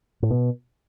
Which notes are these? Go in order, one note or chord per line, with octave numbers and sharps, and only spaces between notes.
A2
B2